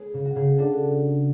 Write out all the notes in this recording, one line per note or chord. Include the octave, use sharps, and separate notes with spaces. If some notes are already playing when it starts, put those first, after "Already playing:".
Already playing: G#3 B3 G#4 B4 C#5
C#3
F#4
C#3 G#4
D4 F#4 A4